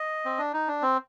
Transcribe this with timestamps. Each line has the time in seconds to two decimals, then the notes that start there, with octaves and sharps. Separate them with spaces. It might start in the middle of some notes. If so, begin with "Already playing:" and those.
Already playing: D#5
0.25 C4
0.39 D4
0.53 D#4
0.68 D4
0.82 C4